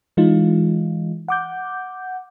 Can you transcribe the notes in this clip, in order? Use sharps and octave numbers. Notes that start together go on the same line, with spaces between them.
E3 G#3 D#4 F4
F#5 D6 G6